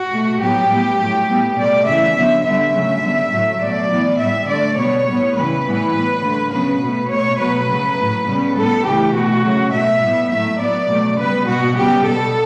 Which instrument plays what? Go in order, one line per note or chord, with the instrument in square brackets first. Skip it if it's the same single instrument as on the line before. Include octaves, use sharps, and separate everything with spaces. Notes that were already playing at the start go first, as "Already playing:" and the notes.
Already playing: [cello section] F#4
B2 A3
A2 F#3 B3 G4
A2 G3 B3
A2 F#3 A3
A2 G3 B3
B2 A3 D5
C#3 E3 A3 E5
D3 F#3 B3
D3 G3 B3 E5
C#3 F#3 A3
D3 G3 B3
A2 F#3 A3
B2 F#3 A3 D5
A2 E3 B3
A2 G3 B3 E5
D3 A3 D5
B2 G3 B3 C#5
A2 G3 B3
C#3 E3 G3 B4
A2 E3 G3 B3
A2 G3 B3
D3 A3
C#3 F#3 B3 B4
B2 A3
B2 A3 C#5
B2 F#3 A3 B4
C#3 F#3 A3
A2 F#3 A3
C#3 G3 B3
A2 G3 B3 A4
C#3 E3 A3 G4
B2 A3 F#4
C#3 F#3 A3
B2 A3 E5
A2 G3 B3
A2 F#3 A3 E5
A2 F#3 B3 D5
B2 F#3 A3
C#3 G3 B3 B4
B2 G3 B3 F#4
C#3 G3 B3 G4
B2 G3 B3 A4